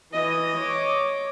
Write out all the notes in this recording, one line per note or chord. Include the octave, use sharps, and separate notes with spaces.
E3 D#5
C#5 D6